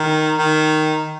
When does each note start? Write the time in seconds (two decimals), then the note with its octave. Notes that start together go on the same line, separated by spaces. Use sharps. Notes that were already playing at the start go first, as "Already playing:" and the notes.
Already playing: D#3
0.38 D#3